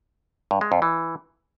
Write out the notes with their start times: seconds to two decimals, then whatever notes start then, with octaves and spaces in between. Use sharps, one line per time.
0.51 G2
0.61 G#3
0.72 F2
0.82 E3